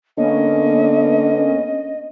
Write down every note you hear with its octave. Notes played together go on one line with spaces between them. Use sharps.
D3 A#3 B3 C#4 D#5